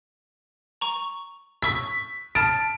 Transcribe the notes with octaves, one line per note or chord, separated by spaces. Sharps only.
A#5 C#6
C#6 E6 B6
A5 F6 A6 D7